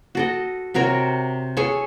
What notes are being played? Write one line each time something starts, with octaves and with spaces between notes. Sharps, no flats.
F#4 A4 D#5
C3 F#4 A#4 C#5
G#4 A4 C#5 G#5